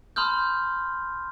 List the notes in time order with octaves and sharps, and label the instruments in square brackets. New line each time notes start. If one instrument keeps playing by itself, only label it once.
[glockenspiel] A5 B5 C6 D#6 F6 G6